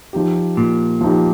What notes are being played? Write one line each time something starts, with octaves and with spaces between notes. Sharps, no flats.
F3 D#4 G4
A#2
F3 D#4 G4